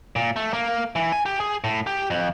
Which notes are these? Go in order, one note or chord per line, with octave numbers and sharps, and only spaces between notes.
A#2
A3
A#3
E3
G#5
G4
G#4
A2
G4
F2